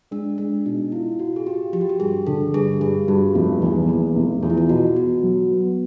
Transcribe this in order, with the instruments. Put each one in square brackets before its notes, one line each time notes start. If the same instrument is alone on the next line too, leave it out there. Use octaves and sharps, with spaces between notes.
[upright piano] G#3 [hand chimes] D4
[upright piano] G#3 [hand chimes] D4
[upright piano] B2 [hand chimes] D#4
[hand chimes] E4 [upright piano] F4
[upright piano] F4 [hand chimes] F#4
[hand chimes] G#4
[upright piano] F4 [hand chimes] G4
[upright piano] F3 [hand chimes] G4
[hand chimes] F#4
G4
[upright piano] G2 [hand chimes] G#4
[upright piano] D3 [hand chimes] A4
[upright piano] G2 [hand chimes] G#4
[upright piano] G2 [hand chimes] G#4
[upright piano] G2 [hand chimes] F#4
[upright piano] F1 [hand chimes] F4
[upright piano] E2 [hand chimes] D#4
[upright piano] E2 [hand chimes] A#3
[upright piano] F1
[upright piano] E2 [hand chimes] F4
[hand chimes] E4
F4
[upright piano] B2 [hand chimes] F#4
[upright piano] B3 [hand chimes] F#4
[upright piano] F#3
B3